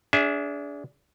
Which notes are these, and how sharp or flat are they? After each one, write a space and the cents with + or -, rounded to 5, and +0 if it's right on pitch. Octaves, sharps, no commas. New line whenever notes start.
D4 -30 G#4 +0 E5 +0